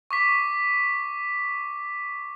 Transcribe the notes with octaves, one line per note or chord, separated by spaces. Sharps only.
C#6 D6 B6